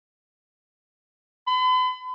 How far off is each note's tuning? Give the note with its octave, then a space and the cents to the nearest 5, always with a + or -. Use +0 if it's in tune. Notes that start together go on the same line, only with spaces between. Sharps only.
B5 +45